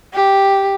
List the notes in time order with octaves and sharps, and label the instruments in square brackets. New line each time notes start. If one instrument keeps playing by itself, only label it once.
[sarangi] G4